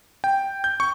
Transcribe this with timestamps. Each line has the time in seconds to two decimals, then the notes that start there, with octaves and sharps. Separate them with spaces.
0.24 G5
0.64 G6
0.80 C#6